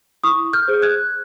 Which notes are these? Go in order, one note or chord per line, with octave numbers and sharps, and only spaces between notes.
E4 C#6 D#6
F6 G6
G#4 C5
F#6 G#6